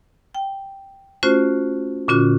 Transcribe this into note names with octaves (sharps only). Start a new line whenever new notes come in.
G5
A3 C#4 F4 F#4 C5
A#2 D3 C#4 F4 F#4